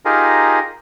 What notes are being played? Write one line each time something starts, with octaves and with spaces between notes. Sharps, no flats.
D#4 F4 G4 G#4 A#4